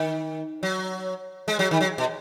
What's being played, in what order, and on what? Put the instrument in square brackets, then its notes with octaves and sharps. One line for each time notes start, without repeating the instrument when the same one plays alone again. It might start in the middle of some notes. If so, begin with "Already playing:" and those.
Already playing: [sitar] D#3
F#3
G#3
F#3
D#3
F#3
B2